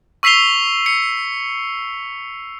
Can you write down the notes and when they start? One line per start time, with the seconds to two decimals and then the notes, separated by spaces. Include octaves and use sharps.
0.23 C#6 E6 B6 C7 F7 G7
0.86 C#7